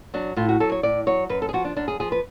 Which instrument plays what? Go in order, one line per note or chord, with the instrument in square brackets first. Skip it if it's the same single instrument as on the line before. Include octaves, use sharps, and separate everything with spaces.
[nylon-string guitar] F#3 D4
A2 F4
F#4
F#3 A4
C#5
A2 D5
F#3 C#5
F#2 B4
A4
G#4
F3 F#4
D4
F#2 D4
G#4
F3 G#4
B4